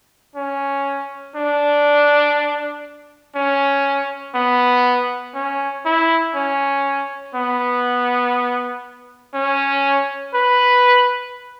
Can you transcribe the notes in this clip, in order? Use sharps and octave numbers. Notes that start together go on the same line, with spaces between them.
C#4
D4
C#4
B3
C#4
E4
C#4
B3
C#4
B4